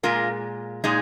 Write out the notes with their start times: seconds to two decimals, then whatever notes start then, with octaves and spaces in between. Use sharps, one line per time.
0.03 A#2 G#3 F4 A#4
0.84 A#2 G#3 D#4 G#4